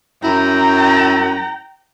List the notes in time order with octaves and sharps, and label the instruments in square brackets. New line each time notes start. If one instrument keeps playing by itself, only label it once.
[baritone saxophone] F#2 [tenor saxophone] E4 [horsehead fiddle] G5 A#5